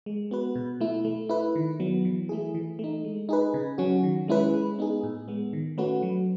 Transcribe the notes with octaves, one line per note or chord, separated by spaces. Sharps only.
G#3
B3 F#4 B4
B2
A3 E4
A3
E4 B4
D#3
F#3 B3
E3
A3 E4 G#4
E3
A3 D#4
G#3
D#4 G#4 B4
C#3
F#3 C#4 F#4
D#3
G#3 C#4 E4 B4
G#3
B3 D#4 G#4
A2
G#3 B3
D#3
A3 C#4 F#4 B4
F#3